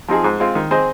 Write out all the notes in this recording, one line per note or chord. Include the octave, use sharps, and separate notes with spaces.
F3 C4 D#4 G#4
G#2
G#3 C4 F4
D#3
C4 G#4 C5 D#5